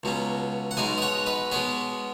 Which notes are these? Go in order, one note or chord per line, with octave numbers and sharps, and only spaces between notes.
C#2 B2 F#3 C#4
F#5
B1 B2 G#3 D#4 D#5 G#5
D#5
C#5 F#5
B4 D#5
B2 G#3 B3 G#4 C#5